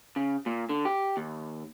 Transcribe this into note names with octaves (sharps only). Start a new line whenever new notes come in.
C#3
A#2
D3
G4
D#2